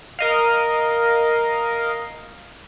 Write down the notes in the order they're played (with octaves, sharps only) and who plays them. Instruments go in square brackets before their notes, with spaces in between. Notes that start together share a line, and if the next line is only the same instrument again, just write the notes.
[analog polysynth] A#4 D#5 F5